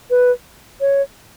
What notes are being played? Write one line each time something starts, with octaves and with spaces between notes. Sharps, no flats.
B4
C#5